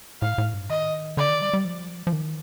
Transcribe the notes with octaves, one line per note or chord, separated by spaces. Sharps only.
A2 F5
A2
G2
D#3 D#5
D3 D5
D#3
G3
G3
F3
F3
D#3